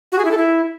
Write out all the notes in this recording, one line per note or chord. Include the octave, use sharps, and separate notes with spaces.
F#4
G#4
E4
A4
E4